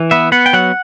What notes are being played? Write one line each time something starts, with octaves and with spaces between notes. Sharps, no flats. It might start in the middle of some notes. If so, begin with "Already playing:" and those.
Already playing: E3
B3 E5
B3 F#5
G5
F#3 F#5